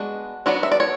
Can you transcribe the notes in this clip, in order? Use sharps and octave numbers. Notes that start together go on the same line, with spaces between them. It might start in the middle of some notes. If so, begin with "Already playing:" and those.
Already playing: G#3 B3 D4 F#4
F#3 B3 D4 F#4
E5
D5
C#5